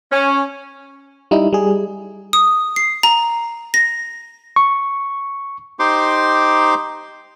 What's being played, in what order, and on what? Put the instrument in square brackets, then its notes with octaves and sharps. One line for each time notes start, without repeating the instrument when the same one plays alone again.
[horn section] C#4
[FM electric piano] G3 D#4 E4
G3 G#4
[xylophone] D#6
C7
A#5
A#6
[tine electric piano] C#6
[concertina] D#4 G4 C5 C6 D6